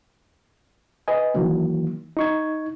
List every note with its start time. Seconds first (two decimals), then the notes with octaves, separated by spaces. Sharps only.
1.08 B4 D#5 G#5
1.34 D#3 E3 F#3 A#3
2.17 D#4 C#6 G#6